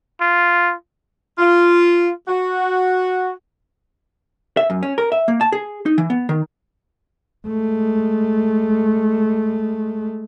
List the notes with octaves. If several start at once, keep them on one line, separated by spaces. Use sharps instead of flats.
F4
F4
F#4
E5
F#2
C#4
A#4
E5
A#3
A5
G#4
D#4
E3
B3
D#3
G#3 A3